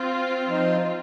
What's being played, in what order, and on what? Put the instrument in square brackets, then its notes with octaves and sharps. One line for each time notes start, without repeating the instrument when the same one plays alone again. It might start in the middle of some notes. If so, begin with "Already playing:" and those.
Already playing: [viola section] C4 F4
[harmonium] F3 D#4 C5 D#5